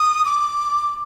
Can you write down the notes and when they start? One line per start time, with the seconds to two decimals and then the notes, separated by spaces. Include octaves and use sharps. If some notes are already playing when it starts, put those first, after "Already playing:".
Already playing: D#6
0.25 D6